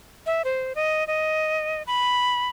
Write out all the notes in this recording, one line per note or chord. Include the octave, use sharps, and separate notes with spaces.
E5
C5
D#5
D#5
B5